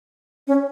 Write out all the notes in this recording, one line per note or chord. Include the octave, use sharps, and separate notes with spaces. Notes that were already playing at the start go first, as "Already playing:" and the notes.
C#4